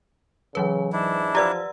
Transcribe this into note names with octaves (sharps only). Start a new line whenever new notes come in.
C#3 E3 F#3 B4
G#2 D4 E4
F3 G4 B4 D5 F#5 A#5 E6